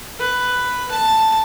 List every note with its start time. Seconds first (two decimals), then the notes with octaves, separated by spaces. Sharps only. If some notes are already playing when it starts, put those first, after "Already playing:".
0.20 B4
0.91 A5